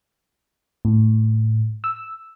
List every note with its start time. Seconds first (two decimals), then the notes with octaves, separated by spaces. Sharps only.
0.85 A2
1.84 E6